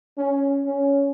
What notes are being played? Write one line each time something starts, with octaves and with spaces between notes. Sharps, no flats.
C#4
C#4